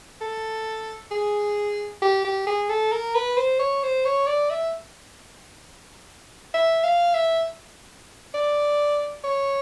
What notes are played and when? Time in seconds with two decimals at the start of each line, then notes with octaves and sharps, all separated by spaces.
0.21 A4
1.11 G#4
2.02 G4
2.24 G4
2.47 G#4
2.69 A4
2.92 A#4
3.15 B4
3.37 C5
3.60 C#5
3.83 C5
4.05 C#5
4.27 D5
4.50 E5
6.54 E5
6.84 F5
7.14 E5
8.34 D5
9.24 C#5